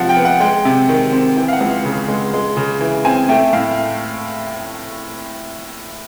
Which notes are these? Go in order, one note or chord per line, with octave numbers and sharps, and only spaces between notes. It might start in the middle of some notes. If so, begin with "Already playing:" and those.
Already playing: C3 F3 G#3 F5 F#5
G5
B3
F#5
G#3 G5
C3
D#3
C4
E3 G5
F5
F#5
C#2
C#3
G#3
G#3
C#3
E3
C4 G#5
A3 G5
A2 F5